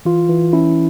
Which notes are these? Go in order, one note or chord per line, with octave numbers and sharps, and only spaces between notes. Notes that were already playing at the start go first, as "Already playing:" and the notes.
E3 F4
E3
C#4 E4